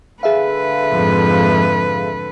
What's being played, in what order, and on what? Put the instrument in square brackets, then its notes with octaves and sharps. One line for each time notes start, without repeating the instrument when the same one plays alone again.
[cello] D3 B4 [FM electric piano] G#4 E5 F5
[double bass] F2 G#2